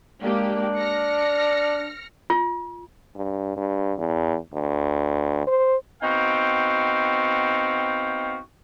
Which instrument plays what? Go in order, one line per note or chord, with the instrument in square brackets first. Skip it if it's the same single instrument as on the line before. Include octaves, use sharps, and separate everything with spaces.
[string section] G#3 A#3 G4 [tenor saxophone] D4
[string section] F6 A#6 C#7
[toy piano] F4
[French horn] G2
G2
E2
D2
C5
[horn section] B3 C4 D#4 F#4 F5 G5